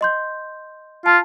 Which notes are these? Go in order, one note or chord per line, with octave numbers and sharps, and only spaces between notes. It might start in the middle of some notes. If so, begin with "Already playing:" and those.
D#5 C6 G6
F4 A5